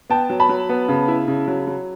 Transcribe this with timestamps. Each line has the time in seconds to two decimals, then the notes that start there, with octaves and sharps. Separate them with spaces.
0.10 B3 G5 A5
0.30 F#3
0.40 A5 B5
0.49 F#3
0.69 B3
0.89 C#3
1.08 E4
1.28 C#3
1.48 F#3
1.67 F#3